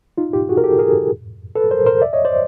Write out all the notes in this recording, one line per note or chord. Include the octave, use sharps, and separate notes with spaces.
D#4 F4
F4 G4
F#4 G#4
A#4
G4 A4
G#4 A#4
A4 B4
A#4 C5
A#4 C5
D5 E5
C#5 D#5
C5 D5